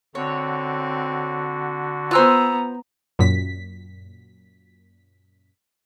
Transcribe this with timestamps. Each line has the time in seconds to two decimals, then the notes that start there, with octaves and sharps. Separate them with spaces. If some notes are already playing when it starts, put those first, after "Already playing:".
0.15 D3 C4 F#4 C#5
2.11 B3 F4 C5 G#5 A#5 E6 F#6
3.19 F#2 A#2 B6